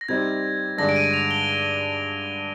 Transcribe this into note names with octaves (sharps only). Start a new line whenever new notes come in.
A#6
C3 G3 C4 D#4 G#6
G2 D3 G#3 D4 A#6
D7
D#7
F7
G7